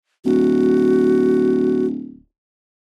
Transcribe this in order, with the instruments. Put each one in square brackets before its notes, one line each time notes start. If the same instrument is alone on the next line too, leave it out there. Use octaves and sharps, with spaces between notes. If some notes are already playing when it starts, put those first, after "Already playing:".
[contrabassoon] D1 [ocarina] F#4